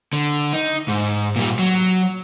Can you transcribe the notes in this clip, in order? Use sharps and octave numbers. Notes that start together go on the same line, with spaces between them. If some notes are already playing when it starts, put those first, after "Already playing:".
D3
D#4
G#2
A#2 G3
F#3